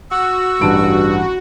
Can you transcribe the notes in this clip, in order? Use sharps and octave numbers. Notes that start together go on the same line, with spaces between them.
F#4 E6
A1 G2 A5 D7